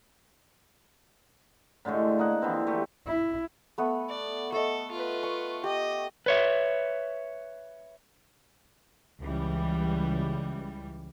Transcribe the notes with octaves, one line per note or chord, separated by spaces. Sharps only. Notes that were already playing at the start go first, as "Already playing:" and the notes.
A2 D3 G#3 A3
A#3 D#5 F#5
D3 E3 F3 C4
A3 G4
E4
A3 B3
D5
A3 A4 D#5
F4 B4
C#6
G4 D#5
B4 C#5 E5
C#2 E3 G3